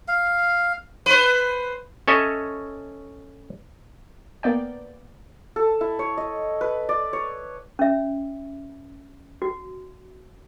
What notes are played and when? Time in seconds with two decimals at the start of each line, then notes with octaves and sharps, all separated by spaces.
0.08 F5
1.06 B4 C5
2.08 C#4 A4 C#5 D#5 E5
4.43 A#3 B3 D5 G5
5.56 A4
5.81 E4
5.99 C#5
6.17 D#5
6.61 B4
6.89 D5
7.13 C#5
7.79 C#4 E5
9.42 F#4